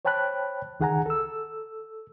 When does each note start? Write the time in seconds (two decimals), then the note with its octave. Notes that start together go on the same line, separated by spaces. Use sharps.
0.05 C5 C#5 G5 A5 B5 F#6
0.80 C#2 D#3 G#4 F#5 G#5 A#5
1.06 A4 E6